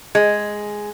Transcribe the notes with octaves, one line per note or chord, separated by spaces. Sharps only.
G#3